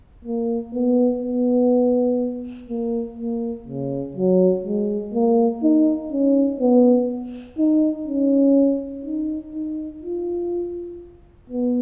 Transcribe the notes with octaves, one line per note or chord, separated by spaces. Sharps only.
A#3
B3
B3
A#3
A#3
C#3
F#3
G#3
A#3
D#4
C#4
B3
D#4
C#4
D#4
D#4
F4
B3